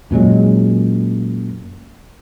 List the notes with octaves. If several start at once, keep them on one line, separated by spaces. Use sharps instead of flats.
F#2 A#2 F#3 G#3